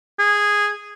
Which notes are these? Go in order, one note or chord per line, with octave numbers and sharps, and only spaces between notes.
G#4